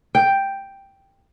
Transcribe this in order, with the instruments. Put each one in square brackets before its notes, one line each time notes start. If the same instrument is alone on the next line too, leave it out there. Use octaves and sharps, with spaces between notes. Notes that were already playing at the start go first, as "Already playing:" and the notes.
[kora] G5